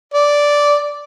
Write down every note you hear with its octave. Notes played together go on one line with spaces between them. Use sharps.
D5